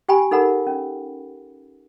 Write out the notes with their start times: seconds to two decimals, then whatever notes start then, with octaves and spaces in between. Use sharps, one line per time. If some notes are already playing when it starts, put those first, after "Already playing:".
0.09 G4 G5 G#5 B5
0.31 D#4 A4 A#4 F#5 B5
0.67 C#4